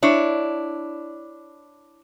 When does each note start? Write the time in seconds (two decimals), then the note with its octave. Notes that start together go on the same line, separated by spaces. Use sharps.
0.03 D4 E4 C#5